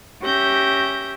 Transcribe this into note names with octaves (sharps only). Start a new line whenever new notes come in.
C#4 G4 E5 G6 A#6